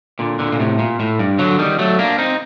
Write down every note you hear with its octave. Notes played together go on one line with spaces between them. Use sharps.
A#2 D3
A#2 D3
A#2
A2 C3
A#2
A2
G2
D3 F#3
D#3 G3
F#3 A3
A#3 D4
C4 D#4